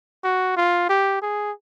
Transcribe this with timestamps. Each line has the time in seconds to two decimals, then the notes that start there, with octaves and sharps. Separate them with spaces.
0.24 F#4
0.57 F4
0.89 G4
1.22 G#4